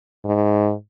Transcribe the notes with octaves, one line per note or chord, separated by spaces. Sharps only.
G#2